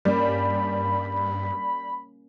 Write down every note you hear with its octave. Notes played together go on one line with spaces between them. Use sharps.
G2 G3 A#3 C#4 B5